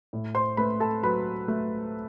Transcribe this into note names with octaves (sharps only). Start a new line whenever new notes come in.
A2
C5 C6
A3 B4 B5
A4 A5
F#3 B4 B5
A3